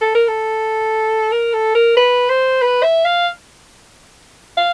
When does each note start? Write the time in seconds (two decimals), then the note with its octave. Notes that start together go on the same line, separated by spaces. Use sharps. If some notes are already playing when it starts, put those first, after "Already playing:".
0.01 A4
0.15 A#4
0.28 A4
1.32 A#4
1.53 A4
1.75 A#4
1.97 B4
2.29 C5
2.62 B4
2.83 E5
3.05 F5
4.57 F5